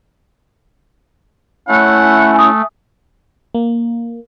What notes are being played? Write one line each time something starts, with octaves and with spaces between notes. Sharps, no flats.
A3 C#4 E4 F#5
G#5 D#6
A#3